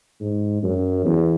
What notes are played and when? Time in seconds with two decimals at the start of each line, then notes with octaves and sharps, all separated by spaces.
0.20 G#2
0.62 F#2
1.05 E2